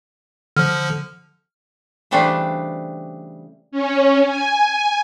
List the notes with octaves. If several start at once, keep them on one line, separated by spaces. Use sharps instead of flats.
D3 F3 F6
C#3 E3 G3 A3 C4 D4
C#4
G#5